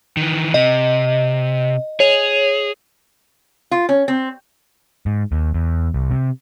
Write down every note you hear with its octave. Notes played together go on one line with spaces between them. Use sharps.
D#3 E3
C3 D#5
G#4 C#5 F7
F4
C#4
C4
G#2
D#2
E2
C2
C3